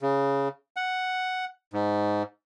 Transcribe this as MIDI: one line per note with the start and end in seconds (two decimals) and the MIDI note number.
0.01 0.48 49
0.76 1.45 78
1.73 2.23 44